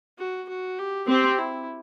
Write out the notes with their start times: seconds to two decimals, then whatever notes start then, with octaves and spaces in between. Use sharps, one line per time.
0.18 F#4
0.48 F#4
0.78 G4
1.08 C4 G4
1.38 E4